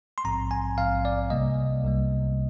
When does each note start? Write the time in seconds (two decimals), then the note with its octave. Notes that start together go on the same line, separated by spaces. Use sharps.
0.18 C6
0.24 A#1 G#2 F3 C4 A#5
0.51 G#5
0.78 A#1 G#2 F3 C4 F5
1.05 D5
1.30 C2 C3 G3 A#3 D#5
1.83 C2 C3 G3 A#3